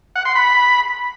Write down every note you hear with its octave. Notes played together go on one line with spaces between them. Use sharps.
F#5
C6
B5